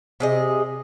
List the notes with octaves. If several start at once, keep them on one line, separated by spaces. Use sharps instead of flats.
C3 G#4 D#5